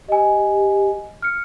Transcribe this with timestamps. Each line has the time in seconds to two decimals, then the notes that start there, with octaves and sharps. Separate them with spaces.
0.09 G4 D#5 G#5
1.22 F6 C#7